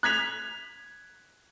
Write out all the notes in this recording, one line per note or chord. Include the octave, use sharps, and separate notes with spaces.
F#6 G#6 B6 F7